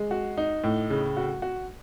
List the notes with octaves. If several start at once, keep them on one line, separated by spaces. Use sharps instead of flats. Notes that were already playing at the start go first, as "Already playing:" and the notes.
Already playing: G#3
F#4
D#4
A2
C#3
F#4
F#4